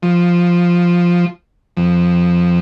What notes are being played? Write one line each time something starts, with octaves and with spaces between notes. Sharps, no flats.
F3
F2